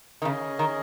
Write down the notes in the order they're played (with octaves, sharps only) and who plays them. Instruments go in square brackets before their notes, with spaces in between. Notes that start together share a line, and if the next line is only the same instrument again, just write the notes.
[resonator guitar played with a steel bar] D#3
[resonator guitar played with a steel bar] C#3 [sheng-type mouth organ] C#4 G#4 D#5
[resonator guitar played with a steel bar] D#3